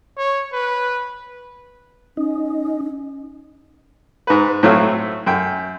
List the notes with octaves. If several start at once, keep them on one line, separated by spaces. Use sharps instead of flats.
C#5
B4
C#4 D#4
G#2 B4
A2 F#3 A3 C4 F5
F#2 G5